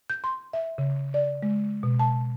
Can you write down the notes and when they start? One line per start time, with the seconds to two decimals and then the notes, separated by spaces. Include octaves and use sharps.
0.10 G6
0.24 C6
0.53 E5
0.78 C#3
1.14 D5
1.43 G#3
1.83 B2
1.99 A5